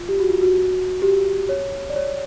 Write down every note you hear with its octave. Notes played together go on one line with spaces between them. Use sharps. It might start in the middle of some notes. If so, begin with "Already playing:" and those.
Already playing: F4
G4
F#4
F4
F#4
G4
C#5
D5
C#5